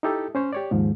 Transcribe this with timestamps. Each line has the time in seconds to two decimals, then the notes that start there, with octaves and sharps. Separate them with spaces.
0.03 D#4 E4 G4 A4
0.35 C#4 C5 C#5
0.53 G4 C#5 D5
0.71 D#2 G#2 F3